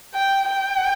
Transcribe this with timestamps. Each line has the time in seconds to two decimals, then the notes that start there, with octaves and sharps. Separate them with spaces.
0.14 G5
0.49 G5